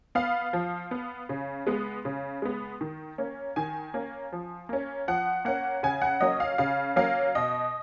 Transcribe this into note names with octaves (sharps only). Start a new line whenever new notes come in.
B3 F5
F3
B3
C#3
G#3 B3
C#3
G#3 B3
D#3
A#3 C#4
D#3 G#5
A#3 C#4
F3
A#3 C#4
F3 F#5
A#3 C#4 F#5
C#3 G#5
F#5
F#3 A#3 C#4 D#5
F5
C#3 F5
F#3 A#3 C#4 F5
B2 D#5